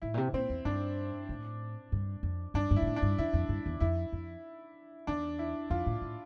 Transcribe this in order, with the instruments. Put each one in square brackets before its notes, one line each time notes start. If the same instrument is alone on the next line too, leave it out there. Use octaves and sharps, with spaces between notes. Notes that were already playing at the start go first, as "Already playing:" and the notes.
[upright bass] A2 [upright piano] E4
[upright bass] A#2
C3
[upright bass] A#2 [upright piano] C4
[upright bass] E2
[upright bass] G2 [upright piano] D4
[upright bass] A2
G2
F2
[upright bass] G2 [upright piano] D4
[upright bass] G2
[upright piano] E4
[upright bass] G2
A2
[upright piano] D4
[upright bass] G2
[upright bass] F2 [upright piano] E4
[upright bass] F2
G2
E2
[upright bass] F2 [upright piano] E4
[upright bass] F2
[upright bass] E2 [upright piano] D4
[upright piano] E4
[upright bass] F2 [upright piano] F4
[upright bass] A2
A2